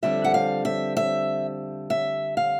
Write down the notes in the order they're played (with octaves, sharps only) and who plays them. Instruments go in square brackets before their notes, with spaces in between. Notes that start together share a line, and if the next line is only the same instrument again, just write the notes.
[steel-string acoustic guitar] F2 D3 G3 C4 E5
F#5
F5
E5
E5
E5
F5